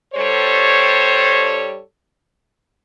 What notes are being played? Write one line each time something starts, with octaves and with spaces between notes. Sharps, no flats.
G2 G3 A4 C5 C#5